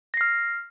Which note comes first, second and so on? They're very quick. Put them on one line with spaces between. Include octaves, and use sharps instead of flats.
A#6 C7 F6